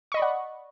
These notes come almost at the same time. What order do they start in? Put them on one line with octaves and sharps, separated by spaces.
C#6 D#5 B5 D5 F#5